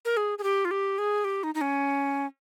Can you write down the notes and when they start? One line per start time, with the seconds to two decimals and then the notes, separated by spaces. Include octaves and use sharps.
0.05 A#4
0.17 G#4
0.38 G#4
0.43 G4
0.65 F4
0.71 G4
0.98 G#4
1.24 G4
1.43 D#4
1.55 D#4
1.61 C#4